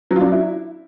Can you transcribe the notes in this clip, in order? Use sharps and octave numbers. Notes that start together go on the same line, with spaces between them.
F#3
F4
D4
F#3
E4